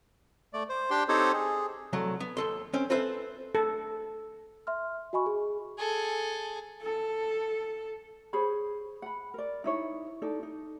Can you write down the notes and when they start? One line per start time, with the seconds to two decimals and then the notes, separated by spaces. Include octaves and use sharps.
0.53 A3 D5
0.69 C5
0.90 D4 G4 G5 C6
1.08 C4 D#4 G4 A4 C5 C#5
1.33 G#4
1.93 C2 F#3 A3
2.20 B3
2.37 D#2 A4 C6
2.74 C4 C#4
2.90 C4 A4 B4 C5 E5
3.55 A4
4.67 E5 C6 F6
5.13 F#4 D#5 G#5 B5 C#6
5.26 G#4
5.78 G#4 A4
6.82 A4
8.33 G#4 C5 C#5 B5
9.02 F#5 B5
9.34 A#4 D5
9.64 D#4 E4 C#5
10.22 D#4 A4 D5
10.43 D#4